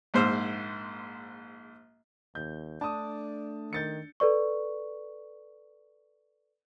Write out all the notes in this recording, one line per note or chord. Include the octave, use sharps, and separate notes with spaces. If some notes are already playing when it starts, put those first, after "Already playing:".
A#1 G#2 C5 E6 F6
D#2 G6
A3 D4 D5 A5 D#6
D#3 G6 A6 C#7
A4 B4 D5 C#6